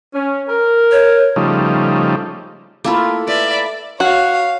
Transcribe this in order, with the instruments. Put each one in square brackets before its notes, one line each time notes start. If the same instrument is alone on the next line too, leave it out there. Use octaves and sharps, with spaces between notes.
[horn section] C#4
A#4
[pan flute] C#5
[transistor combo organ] C#3 F3 G3 A3 D#4
[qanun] A3 E4 F4 [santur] A#3 A4 B5
[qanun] B4 [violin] D5 E5
[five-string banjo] F#4 [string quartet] C#5 F5